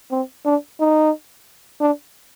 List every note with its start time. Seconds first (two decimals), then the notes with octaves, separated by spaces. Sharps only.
0.11 C4
0.46 D4
0.80 D#4
1.80 D4